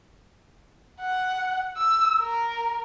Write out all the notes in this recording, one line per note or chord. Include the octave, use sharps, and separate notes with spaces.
F#5
E6
A#4